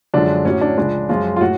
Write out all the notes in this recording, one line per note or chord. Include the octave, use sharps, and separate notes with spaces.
F#2 D3 F3 G#3 D4
A2 F#3 C#4
D4
C#2 C#3 F3 G#3 D4
F#2 F3 G#3 F4
F4
A2 F#4